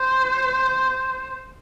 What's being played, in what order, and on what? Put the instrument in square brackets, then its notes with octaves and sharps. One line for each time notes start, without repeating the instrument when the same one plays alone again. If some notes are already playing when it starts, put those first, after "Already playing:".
Already playing: [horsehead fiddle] C5